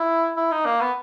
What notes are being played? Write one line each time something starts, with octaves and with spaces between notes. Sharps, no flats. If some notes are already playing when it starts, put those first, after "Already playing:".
Already playing: E4
E4
D#4
A#3
B3